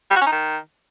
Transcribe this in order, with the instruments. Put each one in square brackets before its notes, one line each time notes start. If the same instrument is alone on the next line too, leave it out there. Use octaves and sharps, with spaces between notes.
[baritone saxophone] G3
F#4
C#4
D#4
D#3